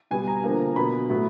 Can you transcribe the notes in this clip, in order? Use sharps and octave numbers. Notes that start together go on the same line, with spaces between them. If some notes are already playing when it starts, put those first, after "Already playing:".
B2 G3 B3 G#5
A#5
D3 F3 A#3
B2 F#3 B3 B5
A2 F#3 B3